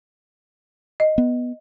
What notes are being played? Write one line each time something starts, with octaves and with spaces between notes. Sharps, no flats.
D#5
B3